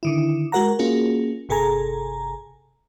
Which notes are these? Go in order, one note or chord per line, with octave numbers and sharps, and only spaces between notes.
D3 D#3 E4
G#3 F#4 A#4 F#5 A#5
A#3 C#4 F4 F#4 G#4
G1 C3 G#4 A4 G#5 A#5